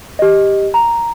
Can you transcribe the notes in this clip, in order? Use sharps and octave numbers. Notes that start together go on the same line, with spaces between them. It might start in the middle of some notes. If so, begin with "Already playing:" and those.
G4 D#5
A#5